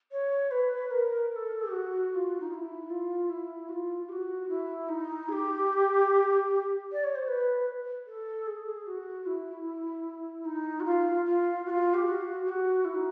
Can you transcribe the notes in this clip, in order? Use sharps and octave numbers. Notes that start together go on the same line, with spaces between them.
C#5
B4
A#4
A#4
A4
F#4
F#4
F4
D#4
F4
E4
F4
E4
F#4
F4
G4
F#4
E4
D#4
G#4
G4
D5
C#5
C5
B4
A4
G#4
A4
G#4
F#4
E4
D#4
F#4
F4
F4
F#4
F4
G4
F#4
G4
F#4
E4
D#4